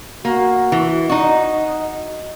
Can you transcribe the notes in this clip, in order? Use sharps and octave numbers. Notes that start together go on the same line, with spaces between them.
A#3 F#4
E3
D#4 F#4 D#5